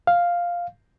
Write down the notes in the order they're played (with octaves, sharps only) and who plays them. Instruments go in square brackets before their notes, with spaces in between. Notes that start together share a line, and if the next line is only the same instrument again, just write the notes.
[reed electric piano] F5